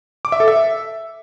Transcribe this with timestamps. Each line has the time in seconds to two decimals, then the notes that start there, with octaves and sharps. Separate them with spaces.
0.25 D6
0.32 E5
0.40 A4
0.48 E5